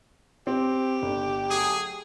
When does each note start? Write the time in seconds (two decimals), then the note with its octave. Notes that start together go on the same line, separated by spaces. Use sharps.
0.47 C4 G4
1.02 G1
1.51 F#3 A3 G#4